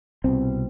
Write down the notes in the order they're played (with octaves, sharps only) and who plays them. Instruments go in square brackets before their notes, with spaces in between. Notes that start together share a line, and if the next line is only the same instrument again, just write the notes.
[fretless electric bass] C2 B2 C4